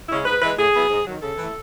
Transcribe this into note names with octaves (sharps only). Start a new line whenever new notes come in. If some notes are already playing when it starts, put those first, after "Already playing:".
C#3 G#3 C#4 E4
G#2 B4
E3 G#3 B4
A2 G#4
F#3 B3 E4
G#2
D#3 F#3
C#3 A4
E3 A3 E4